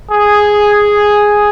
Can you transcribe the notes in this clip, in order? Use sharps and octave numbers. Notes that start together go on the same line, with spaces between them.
G#4